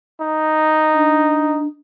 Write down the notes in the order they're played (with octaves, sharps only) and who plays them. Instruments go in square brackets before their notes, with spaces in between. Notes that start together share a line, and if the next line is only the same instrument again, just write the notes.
[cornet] D#4
[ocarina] D4